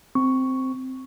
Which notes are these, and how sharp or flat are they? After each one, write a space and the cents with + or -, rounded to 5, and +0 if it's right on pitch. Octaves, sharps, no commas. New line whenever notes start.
C4 -5 C#6 +0